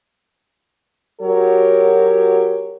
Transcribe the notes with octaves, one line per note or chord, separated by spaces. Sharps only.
F#3 F#4 G4 A#4 C#5